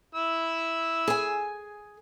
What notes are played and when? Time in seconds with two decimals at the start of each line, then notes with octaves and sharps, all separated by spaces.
0.15 E4 E6
1.08 G#4 G#5